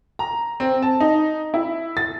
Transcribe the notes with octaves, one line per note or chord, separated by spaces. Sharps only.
A#5
C4
A5
D#4
E4
A6